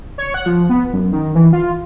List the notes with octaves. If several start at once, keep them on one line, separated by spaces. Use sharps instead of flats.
C#5
F#5
F3
B3
F#2
D#3
E3
F4